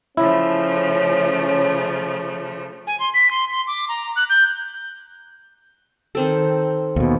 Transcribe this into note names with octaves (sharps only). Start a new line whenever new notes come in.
C#3 F3 A3 C#4 E4
G#5
C6
B6
C6
C6
D6
A#5
F#6
G6
D#3 C4 A4
D#2 B2